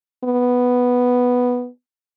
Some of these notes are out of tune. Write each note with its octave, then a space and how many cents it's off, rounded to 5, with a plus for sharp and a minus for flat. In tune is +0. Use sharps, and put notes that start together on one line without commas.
B3 +0